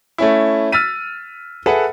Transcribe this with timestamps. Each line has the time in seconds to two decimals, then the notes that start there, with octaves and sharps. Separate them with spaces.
0.18 A3 C#4 E4
0.72 E6 F6 A6 B6 D#7
1.66 G#4 A4 B4 E5 F#5